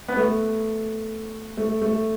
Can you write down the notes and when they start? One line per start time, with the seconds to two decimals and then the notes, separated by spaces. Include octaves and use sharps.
0.08 B3
0.17 A3
1.57 A3
1.82 A3